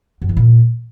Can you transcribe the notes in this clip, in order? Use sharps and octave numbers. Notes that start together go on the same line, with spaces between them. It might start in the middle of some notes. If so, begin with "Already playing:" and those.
F#2
E3
A#2